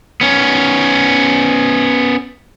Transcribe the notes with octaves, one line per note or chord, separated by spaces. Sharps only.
B3 C#4